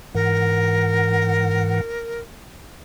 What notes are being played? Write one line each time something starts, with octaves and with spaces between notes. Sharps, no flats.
G#2 E3 A#4 F#5